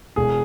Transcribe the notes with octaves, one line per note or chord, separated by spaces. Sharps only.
E1 G#4